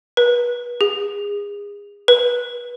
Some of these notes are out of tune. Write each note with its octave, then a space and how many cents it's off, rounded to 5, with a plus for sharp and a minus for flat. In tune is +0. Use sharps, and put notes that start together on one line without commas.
B4 -35
G#4 -30
B4 -25